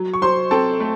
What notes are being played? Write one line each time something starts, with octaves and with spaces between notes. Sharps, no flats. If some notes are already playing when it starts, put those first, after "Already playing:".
Already playing: F#3
C#6
F#3 C5 C6
C4 A4 A5
A3